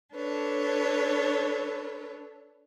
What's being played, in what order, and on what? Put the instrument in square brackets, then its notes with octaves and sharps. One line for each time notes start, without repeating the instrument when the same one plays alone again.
[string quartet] D4 A4 B4 C#5